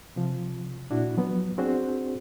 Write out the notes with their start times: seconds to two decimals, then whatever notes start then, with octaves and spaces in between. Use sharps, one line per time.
0.16 C3 F3
0.90 A#2 D4 E4 F#4
1.17 F3 F#3 B3
1.58 C4 D4 F#4 G#4 C5